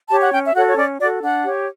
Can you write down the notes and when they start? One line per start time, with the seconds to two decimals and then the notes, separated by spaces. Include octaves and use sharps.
0.09 G4 C#5 A5
0.20 F#5
0.32 C#4 G5
0.46 E5
0.54 F#4 A4 C#5 F#5
0.68 C#5
0.77 C#4 D5
1.00 F#4 A4 D5
1.21 D4 F#5
1.44 G4 C#5